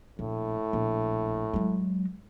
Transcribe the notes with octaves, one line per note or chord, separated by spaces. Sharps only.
A#1 A2
A#1
F#3 G#3